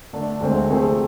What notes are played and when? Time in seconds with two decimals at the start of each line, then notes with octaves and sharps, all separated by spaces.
0.13 D3 A3 D4
0.41 D2 D3 G#3 C4
0.69 C3 F3 A3 C4 G#4